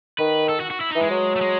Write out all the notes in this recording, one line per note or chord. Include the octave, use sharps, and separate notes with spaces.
D#3 B4
A4
F#4
F#4
E4
D#4
E3
G#3
F#3
A3
G#3